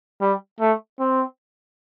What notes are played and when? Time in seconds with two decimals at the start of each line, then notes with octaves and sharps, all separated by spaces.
0.21 G3
0.60 A3
0.99 C4